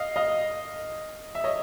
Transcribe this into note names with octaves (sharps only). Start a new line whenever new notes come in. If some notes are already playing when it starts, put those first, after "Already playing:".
Already playing: D#5 F5
D#5 F5
E5
C#5 D#5